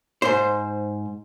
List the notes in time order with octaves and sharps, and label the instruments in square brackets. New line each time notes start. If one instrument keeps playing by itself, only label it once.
[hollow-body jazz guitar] G#2 C5